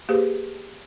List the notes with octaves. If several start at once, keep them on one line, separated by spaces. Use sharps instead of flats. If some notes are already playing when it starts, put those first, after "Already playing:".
A#3 G4 G#4 B4 C5